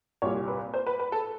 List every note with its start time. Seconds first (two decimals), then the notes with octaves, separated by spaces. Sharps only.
0.22 C2 A#2 G3 C#5
0.48 B4
0.74 C5
0.87 B4
1.00 B4
1.12 A4